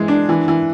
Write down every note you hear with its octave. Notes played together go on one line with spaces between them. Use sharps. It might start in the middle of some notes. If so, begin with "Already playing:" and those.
Already playing: E3 G#3
D4
E3
E3